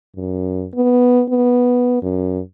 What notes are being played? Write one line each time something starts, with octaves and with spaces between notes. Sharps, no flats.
F#2
B3
B3
F#2